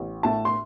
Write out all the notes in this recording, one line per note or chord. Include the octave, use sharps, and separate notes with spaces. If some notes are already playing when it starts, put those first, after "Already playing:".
Already playing: A1
A2 A5
C6